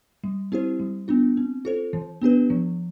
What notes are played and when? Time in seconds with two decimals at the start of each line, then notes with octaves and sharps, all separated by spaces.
0.24 G3
0.52 C4 E4 G4 C5
0.79 G3
1.08 B3 D4 F4
1.37 C4
1.65 F4 A4 C5
1.93 E3
2.22 B3 D4 G4 B4
2.50 F3